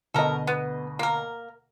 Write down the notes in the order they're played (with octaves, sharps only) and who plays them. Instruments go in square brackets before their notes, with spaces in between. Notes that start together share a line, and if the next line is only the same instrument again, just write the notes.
[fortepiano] D2 B2 D#5 [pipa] A4 A#4
[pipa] B3
A#3 A#4